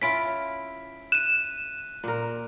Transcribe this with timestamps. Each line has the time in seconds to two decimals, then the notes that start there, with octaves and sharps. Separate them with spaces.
0.02 C#4 E4 F4 B6 D7
1.12 F#6 D#7 E7
2.04 A#2 A#4